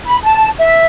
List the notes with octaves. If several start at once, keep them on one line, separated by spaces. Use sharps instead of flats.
B5
A5
E5